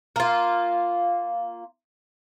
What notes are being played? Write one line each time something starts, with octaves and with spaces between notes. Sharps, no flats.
A#3 F4